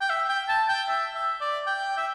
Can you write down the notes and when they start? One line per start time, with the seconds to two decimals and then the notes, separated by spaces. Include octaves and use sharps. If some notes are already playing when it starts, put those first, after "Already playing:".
0.01 G5
0.10 E5
0.29 G5
0.48 A5
0.69 G5
0.88 E5
1.15 E5
1.41 D5
1.67 G5
1.97 E5